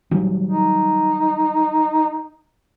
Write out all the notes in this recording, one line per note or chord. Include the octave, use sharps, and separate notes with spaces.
D#3 F#3 G3
D#4